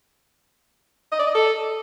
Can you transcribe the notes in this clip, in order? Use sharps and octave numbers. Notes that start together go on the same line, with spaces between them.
D#5
D5
D#5
A4